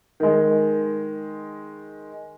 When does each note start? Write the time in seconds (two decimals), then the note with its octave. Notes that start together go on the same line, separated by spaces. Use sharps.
0.20 D#3 G#3